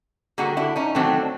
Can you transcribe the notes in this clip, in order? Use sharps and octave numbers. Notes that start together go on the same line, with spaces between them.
D3 G3 A#3 F#4 G#4
D4 E4
C#4 D#4
D#3 F#3 A3 C4 D4